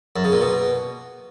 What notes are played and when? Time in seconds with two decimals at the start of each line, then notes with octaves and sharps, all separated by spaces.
0.16 F#2
0.24 C#3
0.32 A#2
0.41 B2